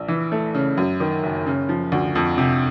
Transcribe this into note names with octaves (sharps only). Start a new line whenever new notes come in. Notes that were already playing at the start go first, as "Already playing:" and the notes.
Already playing: A#1
E3
A3
C#3
F#2
D#3
F#1
C#3
F3
D2
F2
C3